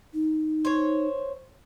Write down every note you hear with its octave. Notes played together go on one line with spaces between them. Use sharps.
D#4
C5 C#5